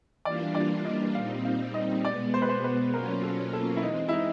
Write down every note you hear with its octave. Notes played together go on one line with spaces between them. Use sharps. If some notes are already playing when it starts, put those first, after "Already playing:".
E3 G3 A#3 D4 F4 D5
D5
D#5
A#2 G3 C4 D#4 F5
F5
D#5
B2 G#3 B3 D5
C5
B4
C5
B4
B2 F#3 A#3 C#4 F4 A#4
A4
A4
E4
E3 G#3 C4 D#4
E4
D#4